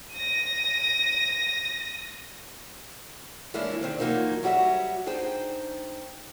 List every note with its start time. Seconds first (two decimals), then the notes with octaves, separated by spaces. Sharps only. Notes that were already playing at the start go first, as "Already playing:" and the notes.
0.14 A#6 D#7
3.54 E3 G#3 A#3 C#4 D4 E4
3.81 D#3 C4 D4
3.99 E3 F#3 G#3 A#3 D#4 F4
4.43 F#3 G3 F#4 A#4 E5
5.06 D4 D#4 G#4 C5 G5